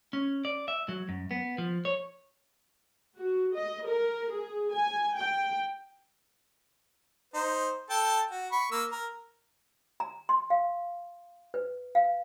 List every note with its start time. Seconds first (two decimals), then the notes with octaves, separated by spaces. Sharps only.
0.13 C#4
0.45 D5
0.68 E5
0.89 F#3
1.09 F#2
1.31 B3
1.58 F3
1.85 C#5
3.17 F#4
3.54 D#5
3.86 A#4
4.32 G#4
4.74 G#5
5.16 G5
7.34 D#4 C5
7.90 A4 G5 A5
8.31 F#4
8.52 B5 C#6
8.72 A#3 E6
8.92 A#4
10.00 A#5
10.29 C6
10.50 F5
11.54 B4
11.95 F5